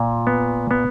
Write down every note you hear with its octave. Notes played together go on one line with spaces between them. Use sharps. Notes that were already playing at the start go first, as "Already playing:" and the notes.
Already playing: A#2
B3
B3